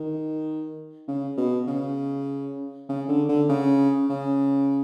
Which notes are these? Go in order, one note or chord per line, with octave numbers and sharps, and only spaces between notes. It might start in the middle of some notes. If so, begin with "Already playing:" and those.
Already playing: D#3
C#3
B2
C#3
C#3
D3
D3
C#3
C#3